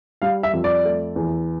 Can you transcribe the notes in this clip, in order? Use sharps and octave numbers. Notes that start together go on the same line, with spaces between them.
G3 F5
E5
F2
D5
A3
E2